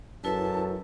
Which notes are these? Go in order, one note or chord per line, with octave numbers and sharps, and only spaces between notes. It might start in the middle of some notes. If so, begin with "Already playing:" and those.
F#2 E4 A4 B4 A5